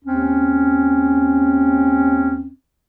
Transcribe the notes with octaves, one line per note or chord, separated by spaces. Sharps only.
D#2 C4 C#4